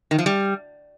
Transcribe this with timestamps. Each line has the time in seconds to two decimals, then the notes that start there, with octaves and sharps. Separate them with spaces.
0.11 D#3
0.19 F3
0.26 G3